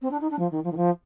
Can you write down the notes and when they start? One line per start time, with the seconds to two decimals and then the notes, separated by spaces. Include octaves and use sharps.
0.02 C4
0.11 D4
0.21 D#4
0.30 D4
0.39 F3
0.51 D#3
0.64 F3
0.72 D#3
0.76 F3